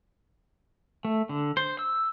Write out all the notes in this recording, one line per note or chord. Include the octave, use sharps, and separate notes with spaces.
A3
D3
C5
E6